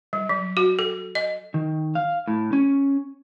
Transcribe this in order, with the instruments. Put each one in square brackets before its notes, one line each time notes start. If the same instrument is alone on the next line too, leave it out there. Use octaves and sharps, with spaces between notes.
[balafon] G3
F#3
F#4
A4
D#5
[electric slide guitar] D#3
F5
A2
C#4